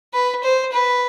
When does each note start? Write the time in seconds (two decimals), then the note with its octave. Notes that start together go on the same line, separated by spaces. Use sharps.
0.13 B4
0.43 C5
0.73 B4